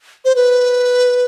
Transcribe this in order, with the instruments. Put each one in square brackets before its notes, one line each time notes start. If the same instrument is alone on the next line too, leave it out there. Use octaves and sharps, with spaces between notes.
[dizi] C5
B4